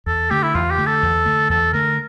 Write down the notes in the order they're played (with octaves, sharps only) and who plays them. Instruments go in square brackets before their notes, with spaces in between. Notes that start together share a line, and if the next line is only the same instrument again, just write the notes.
[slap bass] E2 [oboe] A4
[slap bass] D3 A3 [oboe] G4
[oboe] E4
[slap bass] E2 [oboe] F4
[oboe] G4
[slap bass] D3 A3
[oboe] A4
[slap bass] E2
D3 A3
[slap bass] E2 [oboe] A4
[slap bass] D3 A3 [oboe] A#4